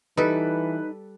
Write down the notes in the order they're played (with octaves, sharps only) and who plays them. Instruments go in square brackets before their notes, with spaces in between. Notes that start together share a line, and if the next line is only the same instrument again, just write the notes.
[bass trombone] E3 [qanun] G3 A4 [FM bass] D#4 [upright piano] B4